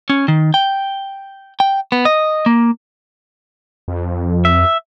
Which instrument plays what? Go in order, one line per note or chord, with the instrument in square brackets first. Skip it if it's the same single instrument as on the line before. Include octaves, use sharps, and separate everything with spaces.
[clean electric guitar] C#4
D#3
G5
G5
B3
D#5
A#3
[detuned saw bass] F2
[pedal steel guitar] E5